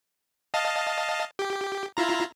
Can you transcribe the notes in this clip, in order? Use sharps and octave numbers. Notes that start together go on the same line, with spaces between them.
D#5 F5 A5
G4
E4 F4 A#5